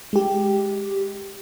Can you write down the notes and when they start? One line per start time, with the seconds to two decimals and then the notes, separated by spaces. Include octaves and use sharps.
0.13 G#3 G4